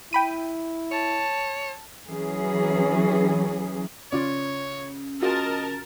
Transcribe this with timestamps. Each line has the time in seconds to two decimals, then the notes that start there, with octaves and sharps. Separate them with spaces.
0.13 E4 G5 B5 D#7
0.91 C#5 A5
2.09 E3 F#3 C#4 G#4
4.12 C#3 F4 C#5 D5
5.22 F4 F#4 G#4 A#4 D#5 A5